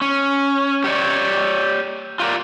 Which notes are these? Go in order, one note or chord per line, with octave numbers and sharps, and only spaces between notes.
C#4
G4 C#5 D5
F4 G4 A#4 D5